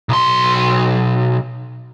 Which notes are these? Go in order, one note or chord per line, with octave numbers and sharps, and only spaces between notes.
B1 C6